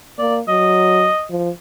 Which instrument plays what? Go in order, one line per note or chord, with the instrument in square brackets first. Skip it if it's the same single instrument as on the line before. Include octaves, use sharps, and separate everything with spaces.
[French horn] A#3 [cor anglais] D5
[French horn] F#3 [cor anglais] D#5
[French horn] F3